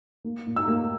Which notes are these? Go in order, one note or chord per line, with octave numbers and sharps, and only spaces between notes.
A#3
A#2
E6
A#3